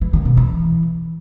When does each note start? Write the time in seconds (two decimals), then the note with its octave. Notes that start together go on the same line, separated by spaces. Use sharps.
0.01 E3
0.13 D#3
0.25 B2
0.37 E3